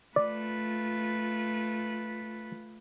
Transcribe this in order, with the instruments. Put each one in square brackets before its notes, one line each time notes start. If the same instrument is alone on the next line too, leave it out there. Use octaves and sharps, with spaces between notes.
[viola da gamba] A3 F4 B4 [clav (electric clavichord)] D5